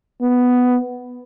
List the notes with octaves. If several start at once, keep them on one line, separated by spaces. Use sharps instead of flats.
B3